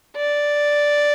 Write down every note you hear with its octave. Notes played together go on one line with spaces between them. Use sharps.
D5